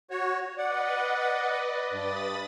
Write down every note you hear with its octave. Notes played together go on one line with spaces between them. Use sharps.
F#4 C#5
B4 D5 D#5 F#5
G2 B5 D#6 A6